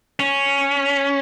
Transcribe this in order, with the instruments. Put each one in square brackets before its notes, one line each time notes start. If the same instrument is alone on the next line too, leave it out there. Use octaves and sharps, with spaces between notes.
[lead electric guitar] C#4